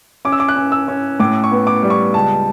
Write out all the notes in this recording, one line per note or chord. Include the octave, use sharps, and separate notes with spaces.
C#4 D6
E6
D6
F#6
C#4
E6
C#4
A2 D6
C#6
B3
D6
G3
C#6
C#2 A5